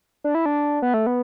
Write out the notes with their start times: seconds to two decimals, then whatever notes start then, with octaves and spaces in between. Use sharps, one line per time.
0.24 D4
0.35 E4
0.46 D4
0.82 B3
0.94 A3
1.06 B3